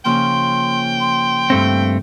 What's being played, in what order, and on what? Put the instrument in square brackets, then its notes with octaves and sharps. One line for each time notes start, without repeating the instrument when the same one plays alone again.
[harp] C#3 F3 A#3 [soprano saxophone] G5 [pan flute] C6
[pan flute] C6
[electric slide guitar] G2 A3 C4